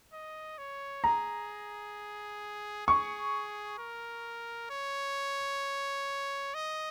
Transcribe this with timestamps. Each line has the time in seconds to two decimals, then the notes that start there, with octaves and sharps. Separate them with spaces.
0.13 D#5
0.58 C#5
1.04 G#4 A#5
2.87 G#4 C#6
3.78 A#4
4.70 C#5
6.54 D#5